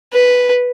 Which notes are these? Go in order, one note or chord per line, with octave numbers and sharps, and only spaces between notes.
B4